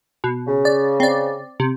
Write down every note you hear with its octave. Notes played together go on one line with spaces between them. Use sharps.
B2
C#3
D5
C4 D5
C3